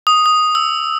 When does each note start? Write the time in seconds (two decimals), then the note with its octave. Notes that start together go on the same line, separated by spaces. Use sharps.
0.07 D#6
0.26 D#6
0.55 E6